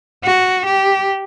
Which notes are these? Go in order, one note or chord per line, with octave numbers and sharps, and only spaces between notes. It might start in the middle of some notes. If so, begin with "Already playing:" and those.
F#4
G4